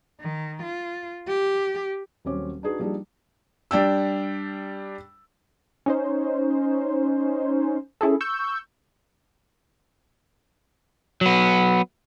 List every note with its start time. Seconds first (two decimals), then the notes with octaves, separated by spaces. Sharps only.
0.21 D#3
0.63 F4
1.28 G4
2.25 D#1 F#3 C4 C#4 D6
2.63 D4 D#4 F#4 G#4 B4
2.79 F3 G3 A#3 D4 D#4 G#4
3.71 G3 D4 G5 E6
5.86 C#4 D#4 C5
8.01 C#4 E4 G#4 A4
8.21 C#6 E6 G6
11.21 F#3 B3